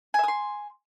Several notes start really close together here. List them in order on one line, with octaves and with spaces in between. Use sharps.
G#5 E5 D#6 C6